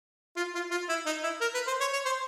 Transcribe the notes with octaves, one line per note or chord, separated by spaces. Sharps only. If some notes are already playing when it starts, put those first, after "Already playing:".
F4
F4
F4
E4
D#4
E4
A#4
B4
C5
C#5
C#5
C5